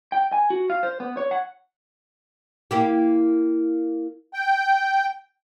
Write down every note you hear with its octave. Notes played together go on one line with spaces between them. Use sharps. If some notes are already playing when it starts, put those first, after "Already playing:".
G5
G#5
F#4
F5
C5
B3
C#5
F#5
A#3 E4 G4
G5